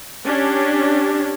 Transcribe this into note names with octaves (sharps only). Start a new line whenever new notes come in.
C#4 D4 G4